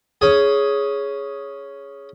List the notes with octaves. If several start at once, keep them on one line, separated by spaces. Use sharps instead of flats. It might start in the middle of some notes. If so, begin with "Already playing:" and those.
C#4 G#4